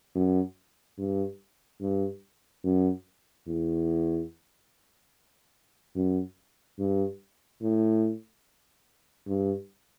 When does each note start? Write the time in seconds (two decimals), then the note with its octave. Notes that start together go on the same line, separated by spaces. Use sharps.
0.15 F#2
0.98 G2
1.81 G2
2.64 F#2
3.47 E2
5.95 F#2
6.79 G2
7.62 A2
9.27 G2